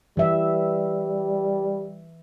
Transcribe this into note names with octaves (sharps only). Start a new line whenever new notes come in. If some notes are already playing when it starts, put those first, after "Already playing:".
E3 G3 E5